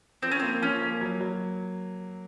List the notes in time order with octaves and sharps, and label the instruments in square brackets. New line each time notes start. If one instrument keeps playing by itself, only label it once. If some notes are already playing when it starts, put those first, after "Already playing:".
[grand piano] F3 [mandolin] C4
[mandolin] C#4
[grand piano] A#3 [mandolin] C4
[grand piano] F3 [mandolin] C#4
[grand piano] A#3
F#3
F#3